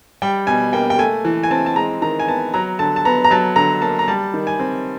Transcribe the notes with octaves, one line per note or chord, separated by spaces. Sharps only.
G3 G5
B2 G#5
A#3 G5
G5
A3 G#5
E3
G#5
C4 A5
A5
G#3 A#5
D#3 A#5
G#5
B3 A5
F#3 A#5
D3 A5
A5
B3 A#5
A#5
F#3 A5
D3 A#5
A#3 A5
A#5
G3 A5
D#3
G#5
C4